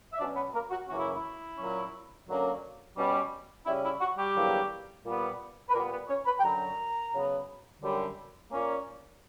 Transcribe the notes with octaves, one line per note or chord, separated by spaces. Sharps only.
E5
B2 F#3 C#4 D4 D5
B3 B4
A#3 A#4
F#4
F#2 C#3 E3 A#3 C#4 F#4
E4
E4
A#2 F#3 C#4
F#2 D3 F#3 A#3 C#4
B2 G3 C#4
C#3 G3 C#4 E4
E4
F#4
G3 G4
E2 D3 F#3 A#3
A#2 G3 B3
B4
A#2 G3 A#3 B3 A#4
B3 B4
C#4 C#5
B4 B5
G5
F#2 D3 F#3 A#4 A#5
C#3 F#3 B3
F#2 D3 G3
A#2 A#3 C#4